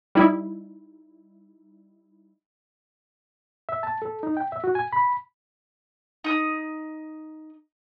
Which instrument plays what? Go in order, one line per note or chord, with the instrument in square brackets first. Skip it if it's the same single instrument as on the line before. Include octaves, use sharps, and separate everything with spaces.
[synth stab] G3 D#4 E4
[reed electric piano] E5
A5
A4
D#4
G5
E5
F#4
G#5
B5
[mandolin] D#4 D#6